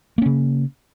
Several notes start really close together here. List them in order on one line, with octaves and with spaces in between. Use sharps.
A#3 C#4 C#3